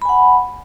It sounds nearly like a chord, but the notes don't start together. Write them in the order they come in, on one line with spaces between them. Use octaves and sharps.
B5 G#5 F#5